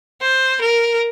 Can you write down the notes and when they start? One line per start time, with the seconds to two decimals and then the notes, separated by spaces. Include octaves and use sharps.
0.22 C5
0.61 A#4